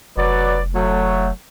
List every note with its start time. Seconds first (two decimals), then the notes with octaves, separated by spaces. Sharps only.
0.17 F1 F#3 B4 D5
0.74 F#3 A3